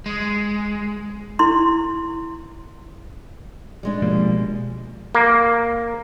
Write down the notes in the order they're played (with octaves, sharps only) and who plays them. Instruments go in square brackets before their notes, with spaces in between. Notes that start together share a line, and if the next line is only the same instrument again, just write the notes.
[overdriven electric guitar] G#3
[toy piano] E4 C6
[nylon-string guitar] G3 G#3 D4
[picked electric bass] B2 F3 A#3
[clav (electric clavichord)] A#3